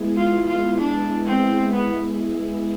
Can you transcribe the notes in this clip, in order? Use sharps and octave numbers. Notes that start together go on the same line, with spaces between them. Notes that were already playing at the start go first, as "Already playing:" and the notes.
Already playing: G#3 B3 E4 G#4
F4
F4
D4
C4
B3